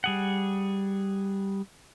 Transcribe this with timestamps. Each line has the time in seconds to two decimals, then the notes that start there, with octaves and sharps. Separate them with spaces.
0.04 G3 G#4 F#5